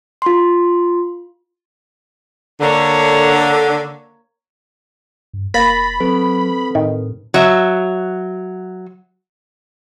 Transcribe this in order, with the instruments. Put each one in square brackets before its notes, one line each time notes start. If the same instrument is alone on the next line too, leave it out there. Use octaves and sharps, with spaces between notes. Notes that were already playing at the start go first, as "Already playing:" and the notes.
[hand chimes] F4 C6
[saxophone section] D3 [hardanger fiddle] A#3 C#5
[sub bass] G2
[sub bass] F1 [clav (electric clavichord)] A#3 [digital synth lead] B5 [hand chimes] A6 A#6
[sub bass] F#3 [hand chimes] C4 A4 B4
[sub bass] A2 [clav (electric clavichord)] D#3
[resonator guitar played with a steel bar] F#3 E5